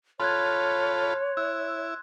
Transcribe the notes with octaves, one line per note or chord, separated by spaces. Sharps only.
F4 A4 C#5 B5 C6 F#6 G#6
E4 E6 F#6